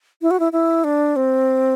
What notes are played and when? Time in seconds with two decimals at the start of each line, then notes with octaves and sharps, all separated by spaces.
0.22 E4
0.31 F#4
0.40 E4
0.52 E4
0.84 D4
1.16 C4